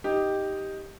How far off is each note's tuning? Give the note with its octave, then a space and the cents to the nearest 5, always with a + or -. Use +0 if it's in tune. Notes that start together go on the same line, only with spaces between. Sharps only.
D#4 +0 G4 +0